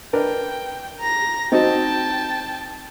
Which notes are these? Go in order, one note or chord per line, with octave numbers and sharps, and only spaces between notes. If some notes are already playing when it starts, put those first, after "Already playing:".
D4 A#4 B4 G5
A#5 A#6
C4 D#4 F#4 G5 A5